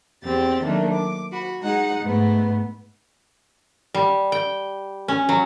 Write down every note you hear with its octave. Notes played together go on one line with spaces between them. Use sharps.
E2 C4 G4 A6
D#3 F#3 A3 A#3 D4
D6
F#4 B5
G#3 D#4 F#5
G#2 A3 B3
G3
G5
C#4
F#3